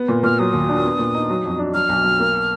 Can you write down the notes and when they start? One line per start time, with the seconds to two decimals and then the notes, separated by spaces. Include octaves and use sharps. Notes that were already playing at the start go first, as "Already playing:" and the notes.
Already playing: B3
0.08 A#2
0.23 A#2 F6
0.39 F#3 D#6
0.53 D#2
0.69 D4
0.84 B3
0.99 A#2
1.15 D#4
1.30 F#3
1.45 F2
1.59 D4
1.74 F#3 F6
1.89 B1
2.04 B1
2.20 A#3